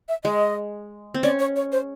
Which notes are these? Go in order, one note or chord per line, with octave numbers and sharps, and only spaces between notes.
E5
G#3 D#5
C4
C#4 D5
C#5
C#5
C5